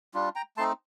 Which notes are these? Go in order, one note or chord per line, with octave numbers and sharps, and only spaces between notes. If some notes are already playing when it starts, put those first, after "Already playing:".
G3 D4 F4
G5 A#5
A3 C4 D#4 A5 C6